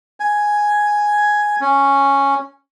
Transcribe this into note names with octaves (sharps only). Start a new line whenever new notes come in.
G#5
C#4